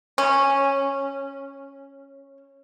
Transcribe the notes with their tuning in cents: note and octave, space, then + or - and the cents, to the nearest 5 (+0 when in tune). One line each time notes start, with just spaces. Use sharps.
C#4 -10